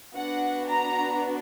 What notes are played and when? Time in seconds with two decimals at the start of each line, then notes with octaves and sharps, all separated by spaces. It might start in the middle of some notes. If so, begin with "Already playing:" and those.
0.15 B3 D4 F#4 F#5
0.68 A#5